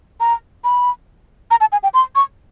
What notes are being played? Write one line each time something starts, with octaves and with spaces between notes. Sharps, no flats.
A#5
B5
A#5
A5
G#5
G5
C6
C#6